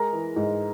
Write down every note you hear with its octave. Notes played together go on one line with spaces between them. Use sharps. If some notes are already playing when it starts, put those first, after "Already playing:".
Already playing: G#3 A#4 A#5
E3
G#2